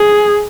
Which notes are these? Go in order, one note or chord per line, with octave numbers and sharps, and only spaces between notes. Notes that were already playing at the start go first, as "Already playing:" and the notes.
Already playing: G#4